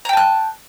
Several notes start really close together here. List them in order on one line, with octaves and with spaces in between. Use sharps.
A#5 G5 A5 F#6